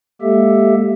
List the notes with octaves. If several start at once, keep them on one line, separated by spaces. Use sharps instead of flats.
G#3 A#3 G4 A4 E5